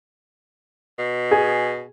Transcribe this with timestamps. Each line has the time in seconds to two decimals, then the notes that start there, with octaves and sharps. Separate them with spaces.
0.98 B2
1.31 G#4